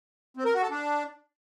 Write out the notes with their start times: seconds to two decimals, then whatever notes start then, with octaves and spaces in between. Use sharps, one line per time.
0.37 C4
0.45 A#4
0.54 F#4
0.62 A4
0.71 D4